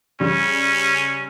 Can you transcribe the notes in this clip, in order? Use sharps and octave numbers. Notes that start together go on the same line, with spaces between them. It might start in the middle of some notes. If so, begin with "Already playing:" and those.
C#3 G3 C#4